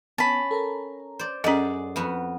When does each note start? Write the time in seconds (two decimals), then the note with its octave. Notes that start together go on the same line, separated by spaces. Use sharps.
0.18 B3 C#4 A5 B5
0.51 A4 A#4 A#5
1.19 C5 D5
1.44 F#2 C#4 G#4 A4 D5 D#5 F#5
1.96 F2 B3 F#4